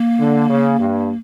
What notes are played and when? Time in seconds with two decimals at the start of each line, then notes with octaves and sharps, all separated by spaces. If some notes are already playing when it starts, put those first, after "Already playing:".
Already playing: A#3
0.19 D3
0.50 C#3
0.80 G2